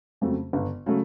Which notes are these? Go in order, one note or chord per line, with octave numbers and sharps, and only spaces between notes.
F2 C#3 F#3 A3
G1
C#3 F#3 A3